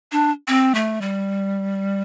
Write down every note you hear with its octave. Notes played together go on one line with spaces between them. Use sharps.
D4
C4
A3
G3